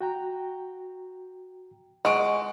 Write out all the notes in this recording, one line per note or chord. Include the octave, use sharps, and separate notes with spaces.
F#4 G5 A#5
G#3 F#5 C#6 D7